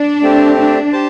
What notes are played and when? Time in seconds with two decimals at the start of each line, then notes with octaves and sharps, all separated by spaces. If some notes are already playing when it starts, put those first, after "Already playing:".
Already playing: D4
0.22 A3 C4 G4
0.57 D4
0.93 G4 C5 A5